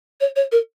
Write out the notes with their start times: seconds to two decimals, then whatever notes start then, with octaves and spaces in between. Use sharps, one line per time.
0.21 C#5
0.36 C#5
0.52 A#4